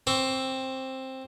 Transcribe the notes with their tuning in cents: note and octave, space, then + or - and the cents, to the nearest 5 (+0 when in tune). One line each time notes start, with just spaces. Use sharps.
C4 +10 C#6 +40